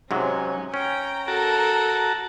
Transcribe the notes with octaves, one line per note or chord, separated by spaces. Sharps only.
G#2 C3 F#3 C#4
C#4 G5 A#5
F#4 A4 A#4 A5 A#5